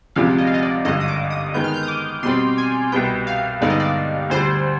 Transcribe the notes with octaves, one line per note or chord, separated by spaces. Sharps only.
D2 C3 F3 G#3 D4 F5
D#5
F5
D#5
D5
G#1 G2 D3 D#5
D#6
D6
D#6
D#3 G#3 B3 G6
F6
G6
D#6
D6
B2 G3 C4 C6
G#5
C2 B2 G3 B3 G5
F5
G2 D3 G#3 B3 D#4 D5
D#5
D5
D2 D3 G3 C5